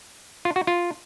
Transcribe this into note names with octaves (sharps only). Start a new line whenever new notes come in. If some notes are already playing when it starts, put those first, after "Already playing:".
F4
F#4
F4